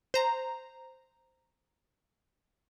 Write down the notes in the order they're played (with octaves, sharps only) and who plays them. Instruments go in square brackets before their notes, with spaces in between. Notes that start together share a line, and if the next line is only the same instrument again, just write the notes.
[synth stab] C5 A#5